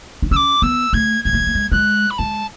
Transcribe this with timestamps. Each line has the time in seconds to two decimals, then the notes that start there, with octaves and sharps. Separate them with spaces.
0.22 D4
0.31 C#4 E6
0.36 D6
0.62 B3 E6
0.93 A3 G#6
1.24 G#3 G#6
1.33 A3
1.40 G#3
1.47 A3
1.55 G#3
1.71 G#3 F#6
2.10 B5
2.18 G#3 A5